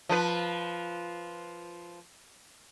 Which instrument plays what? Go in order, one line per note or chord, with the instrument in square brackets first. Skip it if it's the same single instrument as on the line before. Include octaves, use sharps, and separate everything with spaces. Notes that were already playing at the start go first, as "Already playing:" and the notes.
[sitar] F3 F4 B4